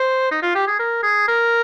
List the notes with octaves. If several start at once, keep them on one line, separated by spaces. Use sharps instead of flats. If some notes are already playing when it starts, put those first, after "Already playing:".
Already playing: C5
D#4
F4
G4
G#4
A#4
G#4
A#4